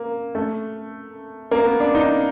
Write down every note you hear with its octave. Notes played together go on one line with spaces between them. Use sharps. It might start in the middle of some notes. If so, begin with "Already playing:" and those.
Already playing: A#3
A3
A#3
B3
D4
D#4